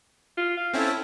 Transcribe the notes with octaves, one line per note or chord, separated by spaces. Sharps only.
F4
F5
C4 C#4 E4 A4